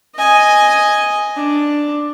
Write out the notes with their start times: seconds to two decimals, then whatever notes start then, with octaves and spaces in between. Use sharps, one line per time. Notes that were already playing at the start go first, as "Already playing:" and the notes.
0.16 D#5 G#5
1.37 D4